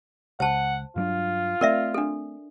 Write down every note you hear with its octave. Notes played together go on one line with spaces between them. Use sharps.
C#2 C5 F#5 A5
G2 F#3 D4 F4
A3 C4 A#4 D5 E5
D4 A4